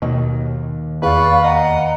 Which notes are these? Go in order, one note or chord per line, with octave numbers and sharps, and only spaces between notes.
D#2 B2 D#3
E2 B4 D5 F5 C#6
D#5 F#5 A#5